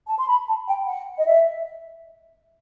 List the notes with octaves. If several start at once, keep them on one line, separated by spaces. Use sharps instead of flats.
A5
C6
B5
A5
G5
F#5
D#5
E5